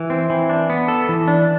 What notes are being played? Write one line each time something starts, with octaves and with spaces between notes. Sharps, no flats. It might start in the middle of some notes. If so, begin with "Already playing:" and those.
Already playing: E3
C4
E3
D4
B3
A4
E3
D4